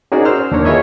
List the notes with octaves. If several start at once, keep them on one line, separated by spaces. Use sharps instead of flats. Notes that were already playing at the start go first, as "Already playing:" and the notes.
C#4 D#4 F#4 G#4 A#4 D5
C5 E6 F6
D#2 D4 A#4 C#5
F4 G#4 B4 C#5 D#5 E5